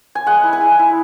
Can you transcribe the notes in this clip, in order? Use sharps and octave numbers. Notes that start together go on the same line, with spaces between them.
G#5
G#3 F#5
E4
G#5
G#3
E4